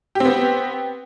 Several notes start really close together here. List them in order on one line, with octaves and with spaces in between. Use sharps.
G4 C4 B3